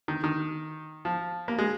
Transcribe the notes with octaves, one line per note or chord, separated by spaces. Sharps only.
D#3
D#3
F3
A#3
G#3